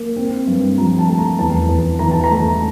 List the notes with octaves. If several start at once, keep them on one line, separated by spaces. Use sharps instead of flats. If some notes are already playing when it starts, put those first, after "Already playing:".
Already playing: A#3
C4
G2
F3 A#5
A5
A3
A#5
E2 A5
E2
E3 A#5
A5
A#5
A3